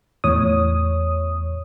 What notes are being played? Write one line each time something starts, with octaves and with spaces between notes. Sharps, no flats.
E2 A2 C#5 D#6